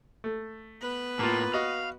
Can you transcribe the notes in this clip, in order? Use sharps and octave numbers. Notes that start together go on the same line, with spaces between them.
A3
B3 B4
A2 A#3 F4
F#4 D#5 F5